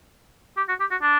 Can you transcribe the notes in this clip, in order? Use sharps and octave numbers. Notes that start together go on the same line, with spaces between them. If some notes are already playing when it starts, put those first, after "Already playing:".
G4
F#4
G4
F#4
D4